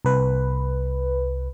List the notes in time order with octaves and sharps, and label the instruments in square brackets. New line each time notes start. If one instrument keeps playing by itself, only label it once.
[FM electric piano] C2 B4